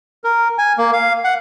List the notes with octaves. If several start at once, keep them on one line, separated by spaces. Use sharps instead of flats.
A#4
G#5
A#3
F5
F#5